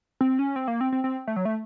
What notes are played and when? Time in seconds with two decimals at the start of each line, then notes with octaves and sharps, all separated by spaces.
0.21 C4
0.39 C#4
0.56 C4
0.68 A#3
0.81 C4
0.92 C4
1.04 C4
1.27 A3
1.36 F#3
1.45 A3